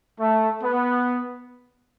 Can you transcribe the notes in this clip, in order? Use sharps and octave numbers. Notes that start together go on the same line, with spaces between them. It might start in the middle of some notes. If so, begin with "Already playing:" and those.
A3
B3